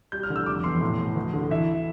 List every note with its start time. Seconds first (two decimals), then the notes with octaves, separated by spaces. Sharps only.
0.12 G3 G6
0.23 F6
0.30 D3
0.36 E6
0.46 F1 D6
0.64 E2 C6
0.81 A2
0.98 A2
1.16 D2
1.34 D3
1.51 E3 E5